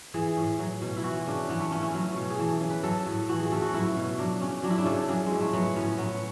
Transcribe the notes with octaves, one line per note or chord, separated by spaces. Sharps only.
E3 G#4
A2
F#3
B2
E4
E3 F#4
C#3 D4
E3 B3
A3
C#3 C#4
E4
F#3
B2
G#4
E3 A4
C#3
B4
F#3 A4
A2
E3 F#4
G#4
C#3 A4
F#4
F#3 E4
B2
F#3 D4
C#3 C#4
F#3 D4
E4
D4
C#3 A4
F#3 G#4
G#3
A2
A3
F#3 B3
A2 C#4
F#3 B3